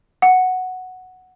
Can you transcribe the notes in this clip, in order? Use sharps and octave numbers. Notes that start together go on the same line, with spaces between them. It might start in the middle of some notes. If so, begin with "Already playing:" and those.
F#5